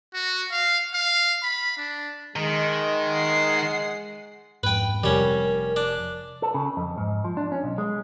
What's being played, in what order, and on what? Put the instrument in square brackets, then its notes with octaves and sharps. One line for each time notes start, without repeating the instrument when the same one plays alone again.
[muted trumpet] F#4
F5
F5
B5
D4
[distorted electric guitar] D#3 [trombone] G#3
[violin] F#5 C7
[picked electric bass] F2 G#2 [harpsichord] B4 G5
[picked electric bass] F1 C3 F3 [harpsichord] G3 C#4 [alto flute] A#4
[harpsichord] D4
[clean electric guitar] A4
C#3
F2
G#2
F3
D4
C#4
B1
G#3